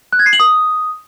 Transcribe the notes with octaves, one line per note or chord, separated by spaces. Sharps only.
F#6
G#6
C7
F#7
D#6